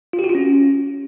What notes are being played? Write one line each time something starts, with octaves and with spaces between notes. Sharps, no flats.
F4
G4
F#4
F4
C#4